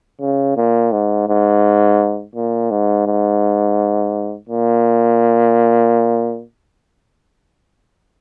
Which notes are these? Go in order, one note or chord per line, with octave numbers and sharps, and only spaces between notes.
C#3
A#2
G#2
G#2
A#2
G#2
G#2
A#2